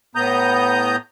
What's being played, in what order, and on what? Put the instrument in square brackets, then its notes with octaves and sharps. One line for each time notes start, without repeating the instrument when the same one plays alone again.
[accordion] A2 B3 A#5 D#6 G6